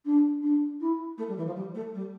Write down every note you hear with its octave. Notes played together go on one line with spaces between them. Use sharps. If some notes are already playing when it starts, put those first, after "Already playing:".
D4
D4
E4
A3
G3
E3
F3
G3
A3
G3